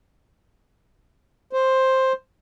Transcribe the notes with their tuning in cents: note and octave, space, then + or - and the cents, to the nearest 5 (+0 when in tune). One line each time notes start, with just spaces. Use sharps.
C5 +5